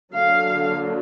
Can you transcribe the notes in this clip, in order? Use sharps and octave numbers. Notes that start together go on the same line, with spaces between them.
D3 F#3 A#3 D4 F5